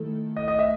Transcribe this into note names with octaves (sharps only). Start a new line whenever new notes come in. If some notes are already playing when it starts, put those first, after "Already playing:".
Already playing: D#3 A3 E4 A4
D#5
D#5
E5